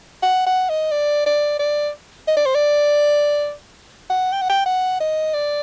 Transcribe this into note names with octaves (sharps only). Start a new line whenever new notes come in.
F#5
F#5
D#5
D5
D5
D5
D#5
D5
C5
D5
F#5
G5
F#5
G5
F#5
D#5
D5